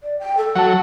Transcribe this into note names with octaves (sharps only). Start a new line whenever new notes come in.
D5
G5
A4
F#3 F#5 A5